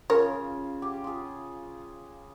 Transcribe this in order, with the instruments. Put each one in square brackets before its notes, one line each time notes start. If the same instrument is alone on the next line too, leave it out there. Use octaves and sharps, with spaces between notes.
[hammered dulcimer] C#3 F4 G#4 [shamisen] A#4 C#5
[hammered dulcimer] G4
F4 G#4